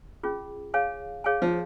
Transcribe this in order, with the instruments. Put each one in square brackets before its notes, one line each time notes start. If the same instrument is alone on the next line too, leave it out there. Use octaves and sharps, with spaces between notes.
[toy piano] C#4 F4 G#4
G#4 C#5 F5 G#5
G#4 C#5 F5 G#5
[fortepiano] F3